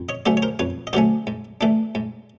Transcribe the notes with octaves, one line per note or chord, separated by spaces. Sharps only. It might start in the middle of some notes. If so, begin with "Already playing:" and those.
Already playing: F2
C#5 D#5
D3 F#3 A3 C#4 C5 D5
C#5
A#4 C5
F2 B4 C#5
D#5
D3 F#3 A3 C#4 C5 D5
G#2
E3 A3 D4
G#2